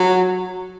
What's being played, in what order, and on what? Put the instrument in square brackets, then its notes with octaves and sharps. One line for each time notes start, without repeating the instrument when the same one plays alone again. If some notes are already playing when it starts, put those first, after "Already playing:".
Already playing: [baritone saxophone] F#3